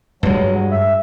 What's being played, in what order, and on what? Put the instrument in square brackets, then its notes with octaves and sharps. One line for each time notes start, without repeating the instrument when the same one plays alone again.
[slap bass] G2 G#3 [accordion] F#3
[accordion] E5